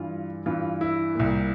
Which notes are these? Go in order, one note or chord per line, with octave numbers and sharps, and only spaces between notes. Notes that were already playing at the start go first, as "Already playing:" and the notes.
Already playing: G2 E3 F4
G2 E3 F4
E4
C2 A#2